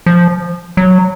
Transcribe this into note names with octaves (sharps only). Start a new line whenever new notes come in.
F3
F#3